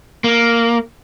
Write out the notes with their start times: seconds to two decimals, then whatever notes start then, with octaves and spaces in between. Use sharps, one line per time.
0.24 A#3